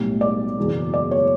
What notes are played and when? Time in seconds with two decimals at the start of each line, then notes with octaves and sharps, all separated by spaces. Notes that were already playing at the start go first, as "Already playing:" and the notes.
Already playing: B1 A2 G3
0.21 D5
0.57 F#1 E2 B2 F#3
0.94 D5
1.11 C#5